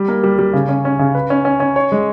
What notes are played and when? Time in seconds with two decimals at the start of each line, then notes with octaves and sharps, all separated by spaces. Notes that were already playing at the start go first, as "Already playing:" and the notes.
Already playing: G3
0.08 A#3
0.24 G3
0.39 G3
0.53 C#3
0.69 C#4
0.85 C#4
0.99 C#3
1.15 B4
1.30 C#4
1.45 C#4
1.60 C#4
1.76 C#5
1.92 G#3